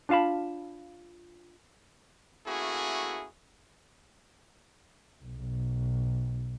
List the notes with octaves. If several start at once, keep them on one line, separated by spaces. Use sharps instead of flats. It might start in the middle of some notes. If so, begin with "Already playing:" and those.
D4 F4 F5 A5 B5
A3 A#3 C#4 E4 F#4 G#4
B1